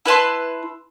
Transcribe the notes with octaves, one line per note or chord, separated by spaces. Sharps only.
E4 B4 A5 C6